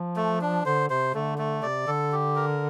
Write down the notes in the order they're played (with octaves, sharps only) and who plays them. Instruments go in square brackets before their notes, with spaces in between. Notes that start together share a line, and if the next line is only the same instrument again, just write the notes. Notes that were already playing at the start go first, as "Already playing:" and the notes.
Already playing: [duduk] F3
[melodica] A3
D4
[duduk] D3 [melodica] C5
[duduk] C3 [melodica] C5
[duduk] D3 [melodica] A3
[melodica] A3
[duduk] C3 [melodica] D5
[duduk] D3 [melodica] A4
[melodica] G4
A#4